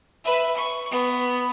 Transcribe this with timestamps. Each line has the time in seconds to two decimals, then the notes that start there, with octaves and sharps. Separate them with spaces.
0.24 B4 E5
0.56 C#6
0.91 B3